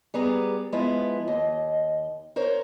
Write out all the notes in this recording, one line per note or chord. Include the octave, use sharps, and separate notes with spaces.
G3 B3 G#4 A#5
F3 G#3 B3 E4 F4
D#2 D#5
A#4 C5 C#5